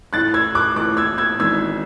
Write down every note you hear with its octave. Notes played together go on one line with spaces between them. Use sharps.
A1 A2 E3 F#6 A6
E6 G#6
D6 F#6
A1 A2 E3 D6 F#6
E6 G#6
E6 G#6
G#1 G#2 E3 E6 G#6